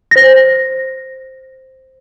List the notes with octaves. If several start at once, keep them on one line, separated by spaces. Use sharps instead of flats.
C5 A#6